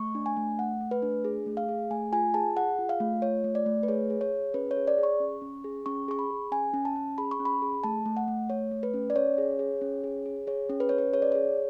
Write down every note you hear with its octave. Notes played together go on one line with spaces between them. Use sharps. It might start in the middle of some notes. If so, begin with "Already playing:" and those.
Already playing: A3 C#6
D4
G#5
A3
A3 F#5
A3
B4
D4
G#4
A3
F5
G#4
A3 G#5
F4 G#5
G#4 A5
G#4 F#5
F4
F5
A3
F4 C#5
A3
D5
A3
B4
G#4 C#5
G#4
C#5
G#4
C#4 B4
C#5
G#4
D5
G#4
C#6
C#4
C#4
G#4
C#4 C#6
G#4 C#6
B5
G#4
C#4 G#5
C#4
A5
C#4
G#4 B5
C#6
C#4
B5
G#4
A3 A5
A3
F#5
A3
A3 C#5
A3
B4
C#4
D5
C#4 C#5
G#4
G#4
C#4
G#4
G#4
G#4 C#5
C#4
B4
C#4 C#5
B4
G#4 C#5
D5
G#4 C#5